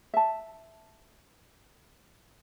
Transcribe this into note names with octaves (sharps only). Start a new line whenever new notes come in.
E5 A5